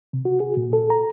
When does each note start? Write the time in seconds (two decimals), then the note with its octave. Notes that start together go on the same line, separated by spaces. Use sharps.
0.13 C3
0.25 F#4
0.40 G#4
0.57 A#2
0.73 A4
0.90 A#5